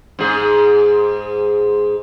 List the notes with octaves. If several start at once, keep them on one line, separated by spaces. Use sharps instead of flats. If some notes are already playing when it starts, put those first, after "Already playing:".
G#2 G#4